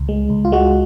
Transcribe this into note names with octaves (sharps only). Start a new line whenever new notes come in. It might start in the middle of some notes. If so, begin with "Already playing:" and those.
Already playing: C#2
G#3
C#2
F4
G#3 F#4